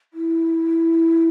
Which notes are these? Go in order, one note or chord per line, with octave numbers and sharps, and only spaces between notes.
E4